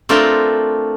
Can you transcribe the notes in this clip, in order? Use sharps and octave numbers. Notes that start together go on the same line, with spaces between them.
A3 C4 D4 F4 A#4 G5